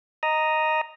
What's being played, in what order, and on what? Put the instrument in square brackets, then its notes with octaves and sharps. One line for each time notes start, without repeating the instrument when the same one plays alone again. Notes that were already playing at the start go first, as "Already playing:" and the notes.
[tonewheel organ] D#5 A#5 D#6